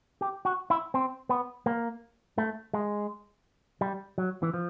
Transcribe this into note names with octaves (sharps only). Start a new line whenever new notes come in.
G4
F#4
E4
C4
B3
A#3
A3
G#3
G3
F#3
E3
F3